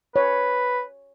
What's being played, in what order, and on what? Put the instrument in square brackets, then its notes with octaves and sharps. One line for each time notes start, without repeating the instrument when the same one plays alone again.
[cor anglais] B4 [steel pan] C#5